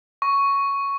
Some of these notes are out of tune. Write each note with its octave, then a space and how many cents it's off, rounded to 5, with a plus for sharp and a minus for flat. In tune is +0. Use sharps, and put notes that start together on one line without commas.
C#6 +5